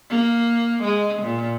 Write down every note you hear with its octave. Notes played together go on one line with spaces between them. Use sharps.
A#3
G#3
A#2